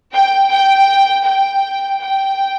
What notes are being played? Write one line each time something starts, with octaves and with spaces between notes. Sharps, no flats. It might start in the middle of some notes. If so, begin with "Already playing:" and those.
G5
G5
G5
G5